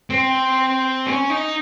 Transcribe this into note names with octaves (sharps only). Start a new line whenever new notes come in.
C4
C#4
D#4